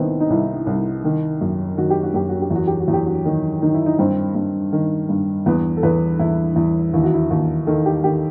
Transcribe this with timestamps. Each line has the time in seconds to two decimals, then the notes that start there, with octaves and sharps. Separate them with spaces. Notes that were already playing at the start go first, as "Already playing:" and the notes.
Already playing: C2 D#3 B3 C4 E4
0.20 D#4
0.30 C2 E4
0.67 C2
1.04 D#3
1.41 F#2
1.77 D#3 F#4
1.90 G4
2.03 F#4
2.14 F#2 G4
2.29 F#4
2.42 G4
2.51 E2 F#4
2.67 G4
2.80 F#4
2.88 E2
2.94 G4
3.06 F#4
3.25 D#3
3.62 D#3 D#4
3.74 E4
3.86 D#4
3.99 G2 C4
4.35 G2
4.73 D#3
5.09 G2
5.46 E2 B3
5.77 A4
5.83 E2 B4
6.20 E2 E4
6.56 E2
6.93 D#2 E4
7.04 F#4
7.13 E4
7.30 D#2 F#4
7.67 D#3 A4
7.86 G4
8.04 D#3 G4